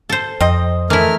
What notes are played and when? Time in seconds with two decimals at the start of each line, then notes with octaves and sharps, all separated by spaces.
0.09 A4 C5
0.41 F2 C4 D#5
0.90 E3 A3 E4 A#4 F6